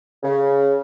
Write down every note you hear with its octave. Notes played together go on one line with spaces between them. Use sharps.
C#3